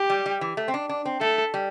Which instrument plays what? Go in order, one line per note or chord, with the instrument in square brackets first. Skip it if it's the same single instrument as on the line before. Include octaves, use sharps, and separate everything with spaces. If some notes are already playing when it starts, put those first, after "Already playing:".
Already playing: [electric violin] G4
[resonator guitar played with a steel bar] G3
G3
E3
A3
C4
D4
D4
C4
[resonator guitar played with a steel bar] A3 [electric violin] A4
[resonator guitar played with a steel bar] G3